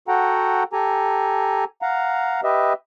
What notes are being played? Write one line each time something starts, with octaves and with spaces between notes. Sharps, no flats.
F#4 A4 F#5 G5 A#5
G4 A4 G#5 A#5
F5 F#5 A#5
G4 B4 D#5 E5